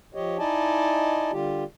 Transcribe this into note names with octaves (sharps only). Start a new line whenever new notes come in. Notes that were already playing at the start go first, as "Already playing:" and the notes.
F3 G4 C#5 D#5
D#4 E4 D5 D#5 G#5 A5
D3 G3 F4 G4